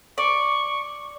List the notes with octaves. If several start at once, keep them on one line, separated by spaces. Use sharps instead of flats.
D5 C#6